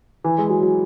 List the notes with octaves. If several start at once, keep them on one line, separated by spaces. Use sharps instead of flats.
E3
G#3
F#3
F#3